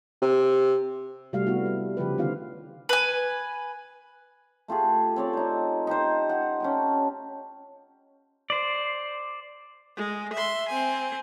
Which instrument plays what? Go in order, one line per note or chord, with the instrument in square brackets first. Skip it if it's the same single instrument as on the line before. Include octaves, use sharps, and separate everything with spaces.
[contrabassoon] C3
[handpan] C3 G3 A3 F#4 F5
A3 B3 E4 F#4
G3
C#3 F3 G4 B4
D3 D#3 B3 F4 F5
[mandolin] B4 G#5
[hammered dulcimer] A3 F4 G4 G#4
C4 C#5 D5
D#4 C5
D#4 G4 C5
F#5
C#4 D4 G4
[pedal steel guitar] C5 D5
[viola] G#3
E5 C6
C4 G#5